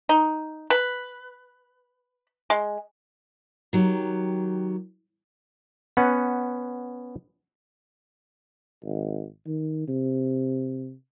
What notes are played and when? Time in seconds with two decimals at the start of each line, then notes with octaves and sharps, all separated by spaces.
0.09 D#4
0.70 B4
2.50 G#3
3.73 D#3 F#3 G4
5.97 B3 C#4 F#5
8.84 G#1
9.46 D#3
9.88 C3